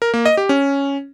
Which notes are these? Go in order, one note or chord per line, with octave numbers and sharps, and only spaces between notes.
A#4
A#3
D#5
G4
C#4